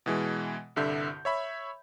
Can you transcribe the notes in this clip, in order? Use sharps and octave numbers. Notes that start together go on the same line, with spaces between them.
B2 E3 G#3
C2 G2 D3 E5 G6
C#5 E5 B5